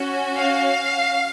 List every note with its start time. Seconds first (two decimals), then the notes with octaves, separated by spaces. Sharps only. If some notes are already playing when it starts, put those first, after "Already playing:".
Already playing: C#4 F#4
0.35 F5